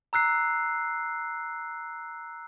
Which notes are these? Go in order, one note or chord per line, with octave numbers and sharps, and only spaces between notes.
A#5 E6 F#6 C7